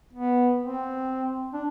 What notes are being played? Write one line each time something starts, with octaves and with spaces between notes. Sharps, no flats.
B3
C4
D4